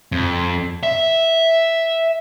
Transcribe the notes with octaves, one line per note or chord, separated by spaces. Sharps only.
F2
E5